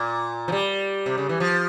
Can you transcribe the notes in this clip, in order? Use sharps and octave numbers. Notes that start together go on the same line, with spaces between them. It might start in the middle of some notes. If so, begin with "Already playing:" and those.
Already playing: A#2
F3
G3
C3
C#3
E3
F3